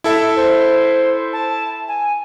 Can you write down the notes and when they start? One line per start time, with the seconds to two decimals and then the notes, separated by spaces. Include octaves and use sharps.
0.04 E4 A4 E5
0.36 C5
1.33 A5
1.88 G#5